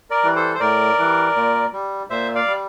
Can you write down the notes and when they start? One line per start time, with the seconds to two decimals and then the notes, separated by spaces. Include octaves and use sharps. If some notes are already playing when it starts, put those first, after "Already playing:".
0.10 A#4 D5
0.23 E3 G3
0.36 A4 C5
0.54 C5
0.60 A2 A#4 D5
0.98 E3 G3
1.36 A#2
1.73 G3
2.10 A#2 C5 E5
2.35 D5 F5
2.47 G3